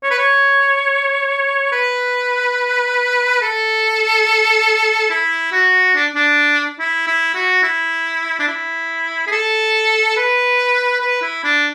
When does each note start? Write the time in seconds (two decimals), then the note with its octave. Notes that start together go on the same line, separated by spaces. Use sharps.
0.03 C#5
0.11 B4
0.19 C#5
1.72 B4
3.41 A4
5.10 E4
5.52 F#4
5.95 D4
6.15 D4
6.79 E4
7.07 E4
7.35 F#4
7.63 E4
8.39 D4
8.48 E4
9.27 G#4
9.32 A4
10.17 B4
11.01 B4
11.22 E4
11.44 D4